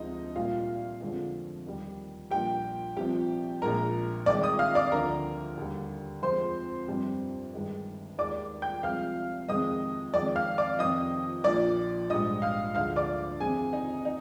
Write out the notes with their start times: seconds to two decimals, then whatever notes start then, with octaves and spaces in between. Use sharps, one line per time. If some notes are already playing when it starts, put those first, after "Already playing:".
Already playing: D2 C3 F3 G#3 D#4 D#5
0.35 C2 A#2 G3 F4 F5
1.00 F2 D3 F3 G#3
1.66 D#2 D#3 G3
2.31 A#1 A#2 G3 G4 G5
2.97 C2 C3 F3 G4 G5
3.62 A#1 A#2 G#3 A#4 A#5
4.26 C2 C3 D#3 G#3 D5 D6
4.43 D#5 D#6
4.59 F5 F6
4.75 D5 D6
4.92 D2 D3 F3 A#4 A#5
5.57 D#2 D3 G3
6.22 F2 C3 F3 G#3 C5 C6
6.88 G1 F2 C3 G3
7.54 G1 G2 D#3 G#3
8.18 D#2 D#3 G#3 D5 D6
8.62 G5 G6
8.83 C2 C3 F3 G#3 F5 F6
9.49 F2 C3 D#3 G#3 D#5 D#6
10.14 F2 D#3 G#3 D5 D6
10.36 F5 F6
10.58 D5 D6
10.79 F2 C3 D#3 D#5 D#6
11.44 A#1 A#2 F3 D5 D6
12.10 A#1 G#2 G3 D#5 D#6
12.42 F5 F6
12.75 D2 D3 F3 G#3 F5 F6
12.96 D5 D6
13.40 F2 C3 D#3 G#4 G#5
13.73 D#4 D#5
14.05 D#4